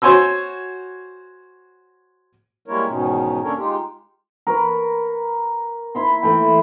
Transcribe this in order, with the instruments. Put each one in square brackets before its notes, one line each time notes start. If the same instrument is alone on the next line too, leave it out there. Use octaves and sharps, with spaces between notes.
[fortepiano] F#4 C5 C#5 G#5 C6 E6
[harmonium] G3 G#3 A#3 E4 A#4 C#5
E2 G#2 B2 D#3 C#4 D#4
A#3 C#4 D4 A4 A#4 C#5
G#3 D#4 F4 G4
[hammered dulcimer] A#4 B4 C#6
E4 B5 C6
E3 A3 G5